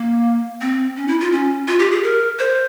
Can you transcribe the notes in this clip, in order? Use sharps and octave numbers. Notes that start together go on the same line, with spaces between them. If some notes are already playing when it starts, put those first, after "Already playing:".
Already playing: A#3
C4
C#4
E4
F4
C#4
F4
G4
G#4
A#4
C5